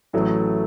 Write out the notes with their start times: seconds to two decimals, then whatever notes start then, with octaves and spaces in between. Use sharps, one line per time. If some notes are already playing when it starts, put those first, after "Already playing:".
0.13 A1 A2 F#3 A3